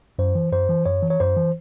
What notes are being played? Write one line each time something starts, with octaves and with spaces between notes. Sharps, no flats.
F#2 C5
E3
F#2 C5
E3
F#2 C#5
E3
C#5
F#2 C5
E3